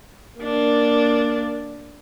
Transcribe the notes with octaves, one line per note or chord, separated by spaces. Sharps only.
A#3 D4